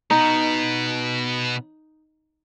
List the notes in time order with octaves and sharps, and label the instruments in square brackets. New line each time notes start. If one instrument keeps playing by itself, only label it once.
[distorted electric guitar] B2 B3 [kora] D#4